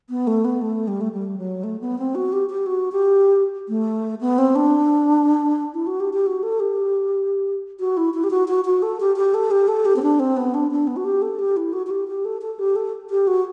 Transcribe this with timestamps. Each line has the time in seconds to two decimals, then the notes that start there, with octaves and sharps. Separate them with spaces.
0.10 B3
0.27 A3
0.45 B3
0.61 A3
0.88 G3
1.01 A3
1.12 G3
1.38 F#3
1.64 A3
1.81 B3
1.99 C4
2.15 F#4
2.33 G4
2.49 G4
2.66 F#4
2.92 G4
3.69 A3
4.21 B3
4.38 C4
4.55 D4
5.74 E4
5.87 F#4
6.00 G4
6.13 G4
6.26 F#4
6.43 A4
6.60 G4
7.80 F#4
7.97 E4
8.14 E4
8.24 G4
8.31 F#4
8.48 F#4
8.65 F#4
8.82 A4
9.00 G4
9.16 G4
9.34 A4
9.51 G4
9.68 A4
9.85 G4
9.96 C4
10.02 D4
10.20 C4
10.37 B3
10.54 D4
10.71 D4
10.87 B3
10.96 F#4
11.05 G4
11.22 A4
11.39 G4
11.57 E4
11.73 F#4
11.86 F#4
11.90 G4
12.08 G4
12.25 A4
12.42 A4
12.59 G4
12.76 A4
13.10 G4
13.27 F#4